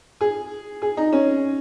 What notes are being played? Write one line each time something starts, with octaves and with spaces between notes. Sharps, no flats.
G#4
G#4
D#4
C#4